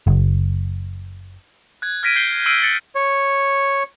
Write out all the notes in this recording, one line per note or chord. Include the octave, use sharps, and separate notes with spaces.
F#1
F#6 G#6
F6 G#6 A#6 B6 D7 D#7
G6 C7 G7
E6 F6 G6 C7 D7 D#7
A6 C#7
C#5